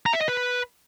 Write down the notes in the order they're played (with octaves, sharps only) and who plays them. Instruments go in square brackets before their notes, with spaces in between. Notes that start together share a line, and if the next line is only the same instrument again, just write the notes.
[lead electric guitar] A#5
E5
D#5
B4